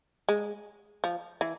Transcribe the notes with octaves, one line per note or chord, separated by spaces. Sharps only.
G#3
F3
E3